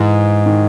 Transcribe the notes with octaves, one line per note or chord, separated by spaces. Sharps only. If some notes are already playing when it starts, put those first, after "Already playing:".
Already playing: G#2 E3
D#3